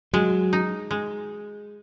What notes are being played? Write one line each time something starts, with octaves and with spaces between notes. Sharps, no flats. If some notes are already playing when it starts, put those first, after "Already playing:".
F#3 G#3
D#4
G#3